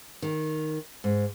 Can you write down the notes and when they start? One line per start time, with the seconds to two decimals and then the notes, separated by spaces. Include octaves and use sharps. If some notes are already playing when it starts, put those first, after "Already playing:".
0.22 D#3
1.04 G#2